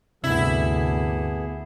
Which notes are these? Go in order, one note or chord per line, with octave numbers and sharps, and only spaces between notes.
D2 G2 C3 B3 E4 G#4